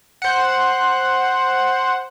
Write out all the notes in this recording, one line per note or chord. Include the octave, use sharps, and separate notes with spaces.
C5 F#5